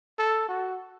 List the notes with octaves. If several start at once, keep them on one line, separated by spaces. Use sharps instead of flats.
A4
F#4